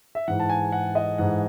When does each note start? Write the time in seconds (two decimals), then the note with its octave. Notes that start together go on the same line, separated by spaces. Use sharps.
0.15 E5
0.28 G#2 E3 F#5
0.40 A5
0.50 G#5
0.72 F#5
0.95 D#5
1.18 G#2 E3 F#5